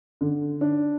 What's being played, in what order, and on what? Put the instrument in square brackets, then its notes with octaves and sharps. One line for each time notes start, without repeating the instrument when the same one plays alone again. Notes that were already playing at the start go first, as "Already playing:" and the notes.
[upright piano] D3
D4